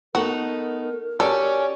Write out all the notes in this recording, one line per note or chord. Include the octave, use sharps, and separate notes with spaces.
A3 B3 D#4 F#4 A#4
C#4 F#4 G4 A4 D5